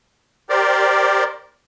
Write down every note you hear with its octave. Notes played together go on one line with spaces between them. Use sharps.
G4 A#4 C5 D5